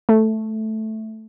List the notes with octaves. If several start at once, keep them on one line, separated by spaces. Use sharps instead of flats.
A3